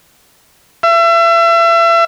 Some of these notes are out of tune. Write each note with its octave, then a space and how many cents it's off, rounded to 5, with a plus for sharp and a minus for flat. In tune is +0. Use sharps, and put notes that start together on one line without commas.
E5 +35